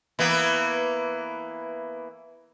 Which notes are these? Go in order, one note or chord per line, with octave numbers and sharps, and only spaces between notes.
E3 A#3 B3